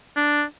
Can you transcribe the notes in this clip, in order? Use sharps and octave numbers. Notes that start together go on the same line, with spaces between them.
D4